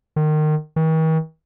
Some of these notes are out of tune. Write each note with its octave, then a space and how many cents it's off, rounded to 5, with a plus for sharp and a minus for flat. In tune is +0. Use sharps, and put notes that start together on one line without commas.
D#3 -25
D#3 +45